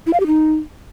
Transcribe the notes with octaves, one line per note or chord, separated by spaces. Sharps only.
E4
F5
G4
D#4